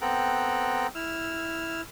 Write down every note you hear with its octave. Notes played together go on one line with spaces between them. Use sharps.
B3 C4 A4 G5 A#5 F#6
E4 E6 F6